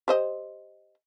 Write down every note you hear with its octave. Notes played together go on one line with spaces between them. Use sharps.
G4 C5 D#5